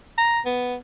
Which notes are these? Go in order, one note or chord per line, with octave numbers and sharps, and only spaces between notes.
A#5
B3